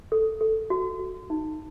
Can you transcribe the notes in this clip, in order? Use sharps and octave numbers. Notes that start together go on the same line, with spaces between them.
A4
A4
F#4
F#4
D#4